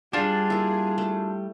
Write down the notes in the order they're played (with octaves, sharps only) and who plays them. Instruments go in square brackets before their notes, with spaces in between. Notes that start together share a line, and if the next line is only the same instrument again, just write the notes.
[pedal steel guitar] G3 G4 [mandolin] D4 F4 [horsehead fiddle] G#4
[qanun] A#3 E4
A3